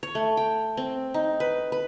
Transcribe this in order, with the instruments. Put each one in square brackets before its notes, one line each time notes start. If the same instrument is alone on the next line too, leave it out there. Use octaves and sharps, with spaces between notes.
[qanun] C#5
A3
G5
C4
D#4
B4
B4